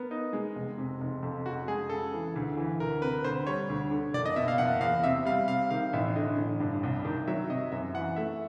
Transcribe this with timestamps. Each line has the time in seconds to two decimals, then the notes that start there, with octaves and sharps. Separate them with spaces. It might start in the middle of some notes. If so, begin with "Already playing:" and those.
Already playing: B3 A#4
0.11 D#4
0.33 G#3
0.55 F1
0.78 C3
1.01 F1
1.23 F2
1.46 C#3 F#4
1.68 G#3 G#4
1.90 C#3 A4
2.13 E3
2.36 D2
2.57 E3
2.80 D2 A#4
3.02 C3 B4
3.24 D2 C5
3.47 G3 C#5
3.69 D2
3.91 D3
4.13 F#1 D5
4.26 D#5
4.36 B2 E5
4.48 F5
4.58 F#1 F#5
4.81 E2 F5
5.04 C3 E5
5.25 G3 F5
5.48 C3 F5
5.70 D#3 F5
5.93 A1 E5
6.16 D3 D#5
6.38 A1
6.60 G2
6.83 C2
7.05 D#3
7.27 F#3 E5
7.49 C3 D#5
7.72 F#2 E5
7.94 E3 F#5
8.16 A3 E5